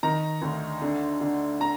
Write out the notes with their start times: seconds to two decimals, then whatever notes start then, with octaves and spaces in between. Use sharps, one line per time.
0.03 D#3 A#5
0.42 D2
0.82 D3
1.21 D3
1.61 A#5